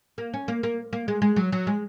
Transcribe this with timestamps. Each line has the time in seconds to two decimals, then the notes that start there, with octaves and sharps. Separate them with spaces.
0.18 A#3
0.34 C#4
0.48 A#3
0.63 A#3
0.93 A#3
1.08 G#3
1.22 G#3
1.36 F#3
1.52 F#3
1.67 G#3